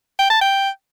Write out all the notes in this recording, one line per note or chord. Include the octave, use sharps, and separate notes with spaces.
G5
A5
G5